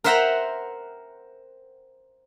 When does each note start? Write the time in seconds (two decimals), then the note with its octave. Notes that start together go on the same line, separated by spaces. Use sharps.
0.04 A#4 C5 E5 F#5 G5 A#5